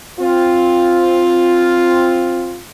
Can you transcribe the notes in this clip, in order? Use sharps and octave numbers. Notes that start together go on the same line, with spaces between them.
C4 F4